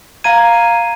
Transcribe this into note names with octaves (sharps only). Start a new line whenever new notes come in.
F5 A#5 G#6 D#7